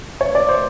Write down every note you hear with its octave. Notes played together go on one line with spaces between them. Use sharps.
C#5
D5
C5